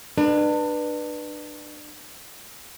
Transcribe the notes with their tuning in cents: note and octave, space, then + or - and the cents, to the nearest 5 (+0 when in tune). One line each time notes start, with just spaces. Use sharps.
D4 +30 B4 -10